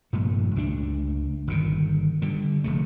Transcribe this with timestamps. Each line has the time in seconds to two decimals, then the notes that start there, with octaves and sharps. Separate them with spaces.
0.13 F1 G2 A#2 A3
0.56 C#2 A3 D4
1.47 G1 A#2 D#3
2.22 D3 G3
2.64 F1 C#3 A3